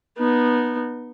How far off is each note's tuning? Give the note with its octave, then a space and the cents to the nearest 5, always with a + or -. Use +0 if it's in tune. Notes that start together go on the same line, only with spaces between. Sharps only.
B3 -20 D#4 -30